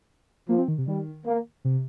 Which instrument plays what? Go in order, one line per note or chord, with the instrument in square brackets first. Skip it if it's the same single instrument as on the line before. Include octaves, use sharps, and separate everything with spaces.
[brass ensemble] F3 [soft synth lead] A#3
[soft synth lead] C4
D#3
C3
[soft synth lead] D#3 [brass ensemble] G3
[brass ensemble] A#3
[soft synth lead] C3